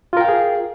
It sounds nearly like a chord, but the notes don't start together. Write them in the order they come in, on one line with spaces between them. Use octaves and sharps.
F4 A#4 G5 F5 G#4